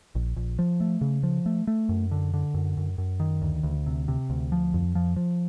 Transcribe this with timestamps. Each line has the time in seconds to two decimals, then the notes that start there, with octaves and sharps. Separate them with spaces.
0.15 A#1
0.36 A#1
0.59 F3
0.80 A3
1.01 C#3
1.23 F3
1.46 A3
1.67 A3
1.89 F#2
2.11 D3
2.34 D3
2.54 F#2
2.77 F#2
2.98 F#2
3.20 D#3
3.42 D2
3.63 D2
3.86 C3
4.08 C3
4.30 D2
4.52 F3
4.74 F2
4.95 F3
5.16 F3